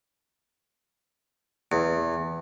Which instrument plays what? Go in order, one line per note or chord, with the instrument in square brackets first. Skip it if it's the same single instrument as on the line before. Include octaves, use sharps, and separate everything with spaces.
[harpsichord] E2